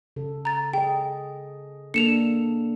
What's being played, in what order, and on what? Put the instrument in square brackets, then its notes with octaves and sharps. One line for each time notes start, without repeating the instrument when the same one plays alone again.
[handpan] C#3 A4
[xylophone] A#5 A6
[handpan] G#4 D#5 [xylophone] G5
[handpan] A#3 D4 A4 [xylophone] C#7 E7 F7